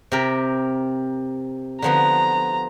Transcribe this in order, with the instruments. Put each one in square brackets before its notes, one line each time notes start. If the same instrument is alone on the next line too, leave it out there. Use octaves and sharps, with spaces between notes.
[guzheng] C3 G4 A#4
[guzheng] D3 F3 B3 [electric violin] A#5